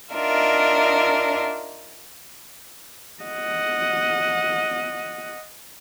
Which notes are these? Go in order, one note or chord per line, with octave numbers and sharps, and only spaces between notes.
D4 D#4 F4 A#4 E5
D#5 F#5